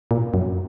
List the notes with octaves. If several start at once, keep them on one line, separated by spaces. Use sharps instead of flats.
A#2
F#2